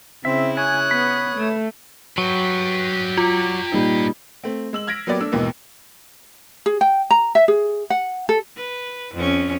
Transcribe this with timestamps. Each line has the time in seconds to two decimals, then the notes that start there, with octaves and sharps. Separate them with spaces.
0.25 C#3 C4 E4 E5
0.57 C#5 G#5 D#6 F#6
0.91 B3 B4 B5
1.36 A3
2.18 F#3 G4 B4
3.17 F4 D6
3.72 A#2 G3 D#4
4.44 A3 C4
4.73 G#3 E6 F#7
4.87 F6 G#6 A#6 B6 D7
5.07 F#3 A#3 B3 G4 B4 D5
5.20 A3 D4 E6
5.32 D#2 G#2 B2 E3 A#3
6.66 G#4
6.81 G5
7.11 A#5
7.35 E5
7.48 G#4
7.90 F#5
8.29 A4
8.56 B4
9.14 F2 C#4